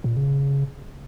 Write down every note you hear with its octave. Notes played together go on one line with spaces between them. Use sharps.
A#2
C#3